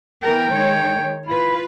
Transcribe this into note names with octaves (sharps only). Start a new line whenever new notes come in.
E3 B3 A#4 G5
D#3 G#3 C#5
E4 F4 B4